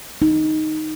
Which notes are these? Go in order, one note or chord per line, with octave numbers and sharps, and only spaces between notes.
D#4